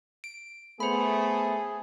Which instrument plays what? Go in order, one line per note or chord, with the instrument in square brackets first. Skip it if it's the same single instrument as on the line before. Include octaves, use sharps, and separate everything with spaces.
[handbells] D7
[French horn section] A3 B3 [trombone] G#4 [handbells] C5 B5